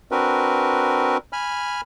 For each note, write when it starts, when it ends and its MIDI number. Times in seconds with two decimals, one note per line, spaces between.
0.11 1.17 60
0.11 1.17 62
0.11 1.17 66
0.11 1.17 70
0.11 1.17 71
1.33 1.81 80
1.33 1.81 83
1.33 1.81 89